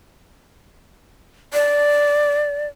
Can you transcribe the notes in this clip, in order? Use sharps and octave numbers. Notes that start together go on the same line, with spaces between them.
D5